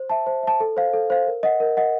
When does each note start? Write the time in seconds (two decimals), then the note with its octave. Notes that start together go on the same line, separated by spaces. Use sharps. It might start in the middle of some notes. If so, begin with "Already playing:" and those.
Already playing: C5
0.09 E5 A5
0.27 C5
0.43 E5 A5
0.60 A4
0.77 C5 F5
0.93 A4
1.10 C5 F5
1.27 A#4
1.43 D#5 F#5
1.60 A#4
1.77 D#5 F#5